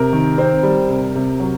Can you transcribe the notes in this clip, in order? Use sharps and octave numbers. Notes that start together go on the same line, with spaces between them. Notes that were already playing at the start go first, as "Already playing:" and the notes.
Already playing: C3 A#4
D#3
C4
G3
C3
C3
F#3